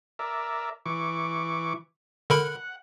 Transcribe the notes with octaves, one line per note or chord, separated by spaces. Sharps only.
A#4 D5 E5
E3 C#6 D6
D3 A#4 F#5 B5